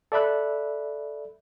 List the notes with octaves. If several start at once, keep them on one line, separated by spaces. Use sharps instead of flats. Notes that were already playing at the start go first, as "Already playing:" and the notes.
A4 D5 E5 B5 F#6